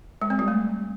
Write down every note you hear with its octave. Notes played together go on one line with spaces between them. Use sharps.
G#3
C4
G3
A3